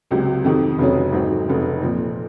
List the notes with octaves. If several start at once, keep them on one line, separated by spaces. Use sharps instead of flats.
C#2 C3 F#3
F2 C3 D#3
F1 F2 C#3 F#3 C#4
G#1 G#2 F#3 C4
F1 F2 C#3
A#2 F3 C4